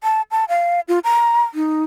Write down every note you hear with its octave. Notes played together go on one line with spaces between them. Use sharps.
A5
A5
F5
F4
A#5
D#4